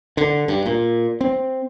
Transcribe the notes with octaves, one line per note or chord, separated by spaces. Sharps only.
D3
G2
A#2
C4